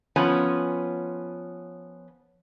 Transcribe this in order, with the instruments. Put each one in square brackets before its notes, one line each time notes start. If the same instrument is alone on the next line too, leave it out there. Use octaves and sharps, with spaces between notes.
[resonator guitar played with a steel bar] F3 B3 C#4